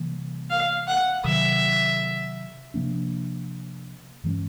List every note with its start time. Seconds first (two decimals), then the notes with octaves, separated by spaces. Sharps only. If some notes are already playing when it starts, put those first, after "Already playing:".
Already playing: C3 E3 G3 A#3
0.50 F5
0.88 F#5
1.24 C3 D#3 F#3 E5
2.74 C3 F3 A#3 D4
4.24 G2 E3 G#3 C#4